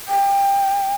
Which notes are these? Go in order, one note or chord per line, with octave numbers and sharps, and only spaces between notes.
G5